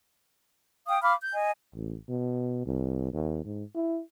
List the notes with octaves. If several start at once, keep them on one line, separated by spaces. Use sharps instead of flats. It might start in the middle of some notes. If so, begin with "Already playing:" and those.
F5 G5 D#6
F5 B5 D6 F6
G6
D#5 G#5
A1
B2
C2
D#2
G#2
E4